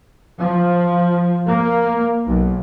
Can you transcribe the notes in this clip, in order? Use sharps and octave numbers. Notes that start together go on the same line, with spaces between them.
F3
A#3
B1